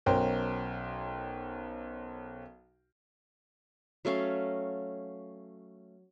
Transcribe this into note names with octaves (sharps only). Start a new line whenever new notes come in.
B1 C#4 A#4 C5 G5
F#3 A3 C#4 F5